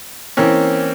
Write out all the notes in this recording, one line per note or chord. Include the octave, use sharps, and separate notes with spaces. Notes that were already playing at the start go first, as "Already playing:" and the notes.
E3 A#3 C4 C#4